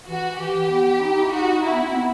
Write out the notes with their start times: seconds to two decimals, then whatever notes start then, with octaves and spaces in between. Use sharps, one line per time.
0.08 E3 F#4
0.39 E3 G4
0.55 E3
0.70 B3
1.01 D#4
1.11 D#4
1.21 E4
1.31 D#4 F#4
1.62 D#4 E4
1.72 B3
1.83 C4
1.94 B3